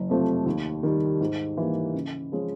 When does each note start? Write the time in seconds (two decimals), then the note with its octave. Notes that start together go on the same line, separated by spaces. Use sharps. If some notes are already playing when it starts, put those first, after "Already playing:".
Already playing: F#1
0.09 F2 C3 F3 A3
0.46 D#2
0.83 D#3 G3
1.21 G#2
1.57 E3 G3 A#3
1.94 C#3
2.32 F3 G#3 C#4